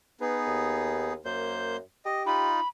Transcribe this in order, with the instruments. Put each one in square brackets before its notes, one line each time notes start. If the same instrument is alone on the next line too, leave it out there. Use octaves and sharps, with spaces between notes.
[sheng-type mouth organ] B3 D#4 G#4 [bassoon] B4
[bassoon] D#2
[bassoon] F#2 [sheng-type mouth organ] A#3 C5 G6
[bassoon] G4 [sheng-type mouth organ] D#5
[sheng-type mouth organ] D#4 F4 [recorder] B5